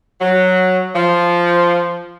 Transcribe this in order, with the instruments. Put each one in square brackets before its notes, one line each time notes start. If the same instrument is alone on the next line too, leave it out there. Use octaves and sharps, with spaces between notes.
[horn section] F#3
F3